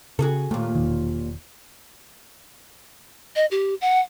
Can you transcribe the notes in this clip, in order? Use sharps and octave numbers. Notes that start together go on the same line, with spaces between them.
C#3 F#4 G#4 A4
D#2 A#2 A3
E1 D#3
D#5
G4
F#5